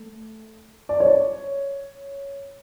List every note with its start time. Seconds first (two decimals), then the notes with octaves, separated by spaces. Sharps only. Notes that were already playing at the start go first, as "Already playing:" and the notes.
Already playing: A3
0.89 D5
1.00 C#5